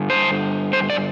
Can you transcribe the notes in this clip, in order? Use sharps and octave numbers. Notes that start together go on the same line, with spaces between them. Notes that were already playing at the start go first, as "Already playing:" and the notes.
Already playing: G2 D3
C5
C5
D5